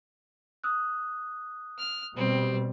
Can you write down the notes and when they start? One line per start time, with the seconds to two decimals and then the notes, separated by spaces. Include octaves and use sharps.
0.64 D#6 E6 F#6
1.78 F6
2.16 B2 G3 C4